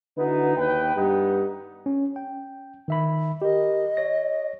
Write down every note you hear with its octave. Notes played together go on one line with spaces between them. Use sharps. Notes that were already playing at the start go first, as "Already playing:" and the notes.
D3 B3 D#4 E4 F#4 B4
D#2 B4 G5
G2 B3 D#4 G4
C#4
G5
D#3 E5 B5
G4 A#4 D#5
C#5 A#6